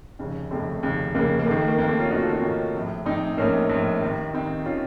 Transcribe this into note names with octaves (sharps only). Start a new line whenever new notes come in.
F1 D#2 C#3
F1 D#2 C#3 A3 C4
F1 D#2 C#3
F1 D#2 C#3 A#3
A#3
D#2 D#3 A3
A3
A#3
D#2 D#3 A#3
A3 C4
C#4 F4
D#2 D#3 D#4 F#4
F4 A4
D#4 F#4
D#2 D#3 C#4 F4
A#1 A2
A#1 A2 C4 D#4
A#1 A2 A#3 C#4
A#1 A2
D#2 D#3
D#2 D#3 C4 D#4
D#3 C#4 F4